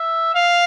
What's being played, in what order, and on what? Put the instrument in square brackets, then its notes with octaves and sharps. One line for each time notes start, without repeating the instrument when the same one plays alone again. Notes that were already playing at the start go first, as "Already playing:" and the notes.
Already playing: [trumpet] E5
F5